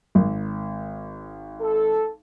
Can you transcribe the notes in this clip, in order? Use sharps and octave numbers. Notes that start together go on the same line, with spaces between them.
G#1
A4